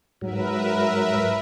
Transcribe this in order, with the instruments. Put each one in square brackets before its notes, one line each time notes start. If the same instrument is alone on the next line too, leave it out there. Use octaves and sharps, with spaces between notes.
[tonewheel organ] G#2 F#3 [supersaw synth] A#4 B4 E5